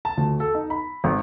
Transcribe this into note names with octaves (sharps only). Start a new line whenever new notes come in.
A5
D2
A4
D#4
B5
G#1